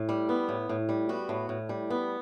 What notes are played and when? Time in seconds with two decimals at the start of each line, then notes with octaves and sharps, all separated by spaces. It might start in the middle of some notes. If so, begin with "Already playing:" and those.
Already playing: A2
0.09 G3
0.29 B3
0.49 A2
0.69 A2
0.89 G3
1.09 B3 F#4
1.29 A2
1.49 A2
1.69 G3
1.90 B3